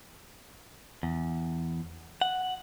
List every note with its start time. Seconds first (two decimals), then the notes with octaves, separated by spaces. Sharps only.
1.03 E2
2.22 F#5